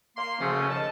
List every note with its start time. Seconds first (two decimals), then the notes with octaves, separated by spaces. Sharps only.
0.17 A#3 C6
0.40 F#2 C#3 F3 A3 C#4
0.70 D#2 D#5 A5